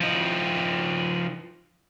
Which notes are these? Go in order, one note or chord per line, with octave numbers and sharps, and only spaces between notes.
F3 D#4